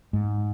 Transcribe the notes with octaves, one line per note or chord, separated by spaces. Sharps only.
G#2